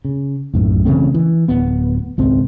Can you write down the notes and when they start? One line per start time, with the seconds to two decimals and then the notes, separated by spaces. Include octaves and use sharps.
0.05 C#3
0.54 B1 F#2 A2
0.85 C#3 E3 A3 C4
1.14 E3
1.48 D1 B3
2.18 G#1 C#2 C4